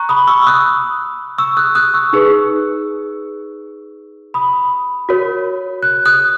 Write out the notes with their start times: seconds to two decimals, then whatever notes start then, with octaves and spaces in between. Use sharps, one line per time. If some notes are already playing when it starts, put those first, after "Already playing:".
Already playing: A#5 C#6 F#6
0.09 B5 D#6
0.27 C#6 E6
0.42 E6
0.47 D#6 F#6
1.38 C#6 E6
1.57 D#6 F#6
1.75 D#6 F#6
1.94 C#6 E6
2.13 D#4 G#4 B4 C#6 E6
4.34 B5 D#6
5.09 F#4 A#4 C#5
5.83 F#6
6.06 D#6 F#6